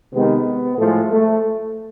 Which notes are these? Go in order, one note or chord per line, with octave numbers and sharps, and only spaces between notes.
C3 D#3 G#3 B3
A2 F3 G#3 A3
A3